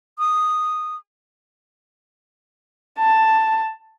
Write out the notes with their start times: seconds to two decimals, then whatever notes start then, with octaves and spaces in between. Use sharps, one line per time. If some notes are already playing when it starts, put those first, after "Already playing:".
0.19 D#6
2.98 A5